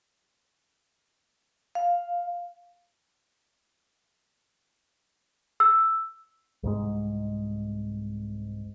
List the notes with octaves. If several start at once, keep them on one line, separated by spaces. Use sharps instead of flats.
F5
E6
C2 G#2 G#3